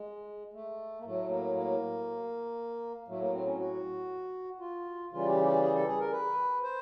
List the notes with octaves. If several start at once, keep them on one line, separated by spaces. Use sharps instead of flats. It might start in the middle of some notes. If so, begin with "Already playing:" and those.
Already playing: G#3
A3
A#3
A2 F#3 A3
A#3
A#3
A2 F#3 A3
A#3
C4
C#4
F#4
F4
C#3 E3 G3 F4
G4
G4
G#4
A4
G#4
A#4
B4
C5